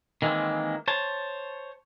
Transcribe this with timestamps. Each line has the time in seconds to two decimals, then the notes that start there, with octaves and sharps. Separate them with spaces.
0.22 D#3 E3 G#3 A#3 C4
0.88 C5 C#5 A5